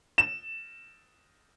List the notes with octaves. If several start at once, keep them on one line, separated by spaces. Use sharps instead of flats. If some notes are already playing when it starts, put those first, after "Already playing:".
E7